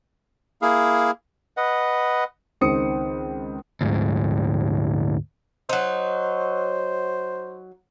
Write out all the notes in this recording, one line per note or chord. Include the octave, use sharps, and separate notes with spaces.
A#3 E4 G#4 F5
B4 D#5 F#5
C#2 D#3 C4 D#6 C#7
D2 G#2
F#3 D#4 C5